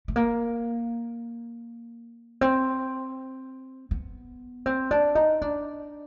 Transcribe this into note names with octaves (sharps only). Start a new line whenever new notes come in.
A3
A#3
C4
B3
C4
D4
D#4
D4